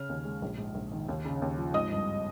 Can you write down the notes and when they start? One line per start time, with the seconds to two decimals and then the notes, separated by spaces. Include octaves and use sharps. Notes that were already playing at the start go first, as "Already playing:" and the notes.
Already playing: C#3 C#4 F6
0.09 D#2
0.25 G#3
0.42 A#1
0.58 G#2
0.75 A#1
0.92 D#3
1.08 D#2
1.25 C#3
1.42 D#2
1.58 F3
1.74 G#1 D#5 D#6
1.91 G2